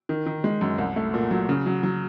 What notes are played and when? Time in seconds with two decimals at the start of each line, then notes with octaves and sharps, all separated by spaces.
0.09 D#3
0.26 D#3
0.44 G#3
0.61 F#2
0.78 C2
0.96 A3
1.14 A#2
1.31 F#3
1.49 C#3
1.66 F#3
1.83 F#3